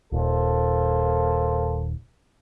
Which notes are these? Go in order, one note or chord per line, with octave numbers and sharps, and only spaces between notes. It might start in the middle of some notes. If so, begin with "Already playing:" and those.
D#1 A#3 A4 C5